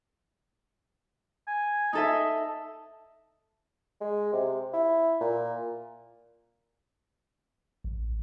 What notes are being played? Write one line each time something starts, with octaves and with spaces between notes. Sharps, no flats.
G#5
D#4 A4 D#5 E5
G#3
C3
E4
A#2
A1